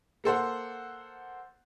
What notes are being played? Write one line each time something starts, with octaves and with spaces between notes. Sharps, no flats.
A#3 A4 C5 F#5